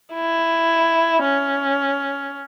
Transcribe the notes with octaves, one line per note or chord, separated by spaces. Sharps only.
E4
C#4